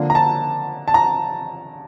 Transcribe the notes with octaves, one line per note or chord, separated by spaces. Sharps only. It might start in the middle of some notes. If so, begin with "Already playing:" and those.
Already playing: D3 F3 A#3 D4
A#5
A5
A5
A#5